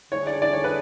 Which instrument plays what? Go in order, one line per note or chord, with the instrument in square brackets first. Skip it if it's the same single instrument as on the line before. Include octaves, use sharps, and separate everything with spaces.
[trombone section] D3 A3 D4 G#4 [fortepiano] C#5
[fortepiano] D5
D5
C#5
B4